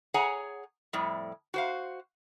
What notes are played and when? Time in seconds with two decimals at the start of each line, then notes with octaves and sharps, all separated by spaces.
0.14 G#4 C#5 F#5 G#5 A#5
0.93 F2 A2 G3
1.54 F#4 C5 F5